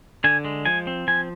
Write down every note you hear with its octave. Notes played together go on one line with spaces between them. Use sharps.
D3 G#5
G#3
F3 G#5
C4
F3 G#5